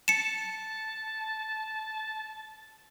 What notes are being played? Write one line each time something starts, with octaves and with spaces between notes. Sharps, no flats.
A5 C#7 E7